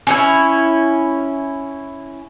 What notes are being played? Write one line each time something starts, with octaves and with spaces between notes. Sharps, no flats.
C#4 D#4 E4